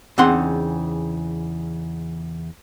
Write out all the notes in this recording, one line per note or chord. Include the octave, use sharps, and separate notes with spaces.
E2 C#3 C4 D#4 F#5 C6